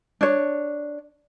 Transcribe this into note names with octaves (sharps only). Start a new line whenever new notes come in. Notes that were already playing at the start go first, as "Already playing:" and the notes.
D4 C#5